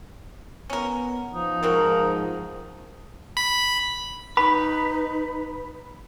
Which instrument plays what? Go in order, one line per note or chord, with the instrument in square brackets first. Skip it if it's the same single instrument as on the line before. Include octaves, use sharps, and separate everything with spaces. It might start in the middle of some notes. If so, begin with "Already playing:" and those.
[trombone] B3 [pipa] C#4 A#4
[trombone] F3 [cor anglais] D#4
[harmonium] G#2 F3 [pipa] C#3 C4 F#4 [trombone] A#4
[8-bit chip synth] B5
[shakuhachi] D#4 [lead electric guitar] B4 [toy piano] B5